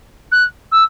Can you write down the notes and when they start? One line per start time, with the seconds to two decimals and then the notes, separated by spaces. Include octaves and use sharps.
0.32 F#6
0.72 E6